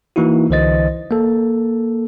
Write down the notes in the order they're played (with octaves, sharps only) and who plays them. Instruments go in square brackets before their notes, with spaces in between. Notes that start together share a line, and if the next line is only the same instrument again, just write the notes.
[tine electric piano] E3 A#3 D#4 E4 F#4
C2 D3 E3 C5 D#5 A6
A#3 A4